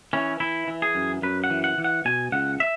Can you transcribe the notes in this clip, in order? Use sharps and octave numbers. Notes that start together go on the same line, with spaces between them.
E3 C#4
E3 E4
E3
G#4
F#2
F#2 B4
F#5
E3
F#5
E3
F#5
B2 G#5
C#2 F#5
E5